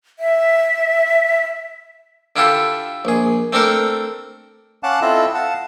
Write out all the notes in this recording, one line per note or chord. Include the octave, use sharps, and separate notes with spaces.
E5
D3 E4 F4 G4 A4
A#1 G#4
A3 C4 D4 A4 A#4
C#4 F5 F#5 A5 D6 F#6
C4 E4 F4 A4 D#5 E5
F5 F#5 A5